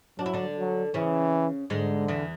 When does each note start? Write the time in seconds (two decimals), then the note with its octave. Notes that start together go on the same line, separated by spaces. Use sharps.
0.19 F#3 D4
0.26 E4
0.33 D3 D4
0.56 F#3
0.94 C#3 E3 C#4
1.70 G#2 D3 G#3
2.08 E2 E3